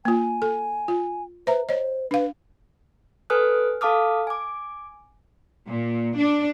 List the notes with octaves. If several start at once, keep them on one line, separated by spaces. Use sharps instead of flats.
A#3 F4 G#5
A4
F4
B4 C5 E5 A#5
C5 C#5 D#5
D4 B4 F5
A4 B4 G#5 D#6 F6 F#6
A4 F5 A5 D6 D#6 F6
G#5 D6
A#2
D4